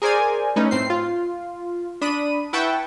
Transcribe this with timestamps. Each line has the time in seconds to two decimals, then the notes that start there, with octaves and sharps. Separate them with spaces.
0.02 G#4 A#4 C5 D5 G#5
0.56 A3 C#4 D#4 B4
0.71 A2 C4 C7
0.90 F4
2.01 D4 B5 D#6 D#7
2.53 E4 B4 F#5 G5 A5 C#6